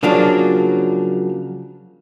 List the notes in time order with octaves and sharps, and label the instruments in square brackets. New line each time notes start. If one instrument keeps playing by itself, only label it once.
[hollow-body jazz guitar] C#3 F3 F#3 A#3 D4